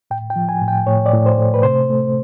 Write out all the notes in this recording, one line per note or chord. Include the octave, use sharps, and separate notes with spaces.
A2 G5
G5
F3
G#5
A2
G5
A2 C#5
D5
A2
C5
A3
B4
C3 C5
A3